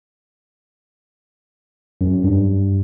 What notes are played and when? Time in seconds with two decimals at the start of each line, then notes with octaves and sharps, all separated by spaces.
2.01 F#2
2.24 G2